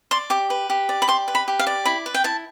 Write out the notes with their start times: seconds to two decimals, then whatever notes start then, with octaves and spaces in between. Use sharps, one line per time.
0.11 D5 C6
0.30 G4 D6
0.50 B4
0.70 G4
0.89 D5
1.02 B5
1.08 G4 C6
1.28 B4
1.35 B5
1.48 G4
1.59 F5
1.67 D5
1.85 E4 B5
2.06 B4
2.14 G5
2.24 E4 A5